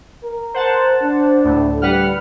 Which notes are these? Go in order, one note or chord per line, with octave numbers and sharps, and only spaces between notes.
A#4
C5 F#5 A5
D4
D2 A2
G3 B4 F#5 F6